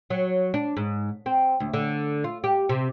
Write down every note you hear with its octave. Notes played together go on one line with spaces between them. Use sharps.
F#3
D4
G#2
C4
D2
D3
F4
G4
C3